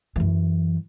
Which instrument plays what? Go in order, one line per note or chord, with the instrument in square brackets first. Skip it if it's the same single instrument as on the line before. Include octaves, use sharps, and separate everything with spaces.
[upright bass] F#2 E3